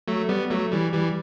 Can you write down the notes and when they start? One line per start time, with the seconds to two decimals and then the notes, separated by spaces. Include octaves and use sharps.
0.08 F#3 A3
0.29 G3 B3
0.50 F#3 A3
0.72 E3 G3
0.93 E3 G3